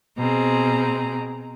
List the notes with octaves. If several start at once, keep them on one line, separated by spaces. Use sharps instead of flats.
B2 C4 G#4 A#5